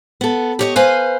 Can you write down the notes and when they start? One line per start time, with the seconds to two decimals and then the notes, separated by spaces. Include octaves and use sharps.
0.21 B3 A4
0.59 G4 C#5 D#5
0.76 B4 C5 F5 G#5